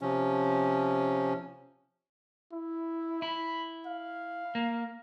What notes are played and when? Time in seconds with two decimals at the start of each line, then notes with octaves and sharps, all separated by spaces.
0.01 C3 F3 C#4
2.53 E4
3.22 E4 B5
3.86 F5
4.55 A#3